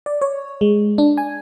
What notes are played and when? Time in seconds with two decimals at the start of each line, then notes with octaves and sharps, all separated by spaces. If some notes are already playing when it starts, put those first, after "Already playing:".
0.06 D5
0.22 C#5
0.61 G#3
0.98 D4
1.17 G#5